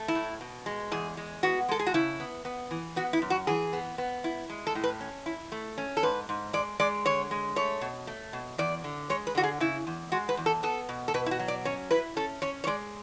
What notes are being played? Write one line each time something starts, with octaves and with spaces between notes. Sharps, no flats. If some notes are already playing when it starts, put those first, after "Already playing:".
Already playing: A3
E4
A2
B2
G#3
E2 G#4
G#3
B3 F#4
G#3 A4
G#4
F#4
C#3 E4
B3
B3
E3
B3 F#4
E4
F#2
F#4
E3 G#4
B3
B3
E4
G#3
A4
A2
B4
C#4
E4
A3
C#4
A4
G#2 B4
G#2
G#3 D5
G#3 D5
D3 C#5
G#3
A3 C#5
B2
A3
B2
E2 D5
D3
G#3 C#5
B4
D3 F#4
G#4
C#3 E4
E2
G#3 F#4
B4
E2
A4
B3 A4
B2
A4
B2 B4
E4
F#4
F#3
D5
C#4 C#5
E4 B4
C#4 A4
C#4 C#5
C#5
G#3 D5